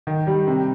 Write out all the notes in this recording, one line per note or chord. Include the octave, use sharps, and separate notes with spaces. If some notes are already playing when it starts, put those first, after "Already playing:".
D#3
G3
C3